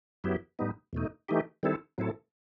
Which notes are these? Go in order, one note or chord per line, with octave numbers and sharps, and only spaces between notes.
F#2 F#3 B3 E4 G4
A2 G3 B3 D#4
E2 B2 A3 D#4
E3 A3 D#4 G4
D#3 G3 C4 E4 A4
A2 F#3 C4 E4 A4